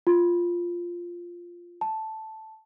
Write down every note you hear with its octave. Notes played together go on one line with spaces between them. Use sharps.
F4
A5